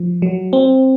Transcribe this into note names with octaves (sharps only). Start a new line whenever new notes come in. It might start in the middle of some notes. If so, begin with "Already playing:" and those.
Already playing: F3
F#3
C4